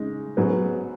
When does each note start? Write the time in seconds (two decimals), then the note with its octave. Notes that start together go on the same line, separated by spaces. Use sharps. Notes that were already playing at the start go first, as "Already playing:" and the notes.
Already playing: C#3 G#3 D#4
0.37 G#2 F#3 B3